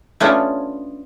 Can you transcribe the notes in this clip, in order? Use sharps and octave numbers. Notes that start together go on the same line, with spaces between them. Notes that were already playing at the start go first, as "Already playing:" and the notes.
A3 B3 C#4 D4 F4 C#5